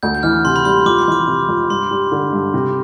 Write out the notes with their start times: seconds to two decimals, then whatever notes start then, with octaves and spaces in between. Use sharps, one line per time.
0.03 D2 G6
0.15 G6
0.23 E3 F6
0.45 C3 C6
0.56 B5
0.65 G3 C6
0.86 F2 D6
0.98 C6
1.08 E3 D6
1.28 C3
1.49 F2
1.70 G2 C6
1.91 G3
2.12 D3
2.33 G2
2.54 C3